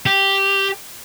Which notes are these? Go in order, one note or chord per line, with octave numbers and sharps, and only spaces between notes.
G4